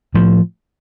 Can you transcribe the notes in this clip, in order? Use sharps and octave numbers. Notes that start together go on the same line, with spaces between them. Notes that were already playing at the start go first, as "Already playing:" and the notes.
A2 F3